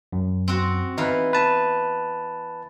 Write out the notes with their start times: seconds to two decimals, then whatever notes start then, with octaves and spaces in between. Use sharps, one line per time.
0.12 F#2
0.48 C4 F#4
0.98 E3 B3 D#4 B4 F5
1.33 B4 A5